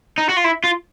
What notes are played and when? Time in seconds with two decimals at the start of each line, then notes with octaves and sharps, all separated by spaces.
0.18 D#4
0.29 F#4
0.37 F4
0.44 E4
0.64 F4